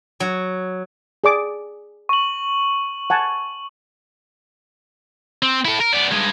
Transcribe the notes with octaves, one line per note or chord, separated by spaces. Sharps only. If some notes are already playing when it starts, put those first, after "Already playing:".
F#3
G#4 D5 D6
C#6 F#7
F#5 G#5 A5
C4
E4 A4
A#4
B3 D5
G2 G#3